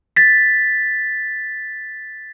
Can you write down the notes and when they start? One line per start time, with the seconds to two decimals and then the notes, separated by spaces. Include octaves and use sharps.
0.16 A6 B6